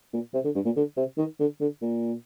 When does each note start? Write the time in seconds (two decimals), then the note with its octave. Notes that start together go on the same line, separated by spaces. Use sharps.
0.13 A#2
0.34 C3
0.45 D3
0.55 G2
0.65 A#2
0.76 D3
0.97 C3
1.18 D#3
1.40 D3
1.61 D3
1.82 A#2